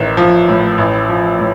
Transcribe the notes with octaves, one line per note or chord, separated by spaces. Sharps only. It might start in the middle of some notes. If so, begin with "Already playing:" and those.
Already playing: A1 D#3
F3
A2
A1
F3
A2